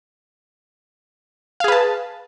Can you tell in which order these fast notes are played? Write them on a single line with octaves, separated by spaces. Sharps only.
F5 G#4 B4 A5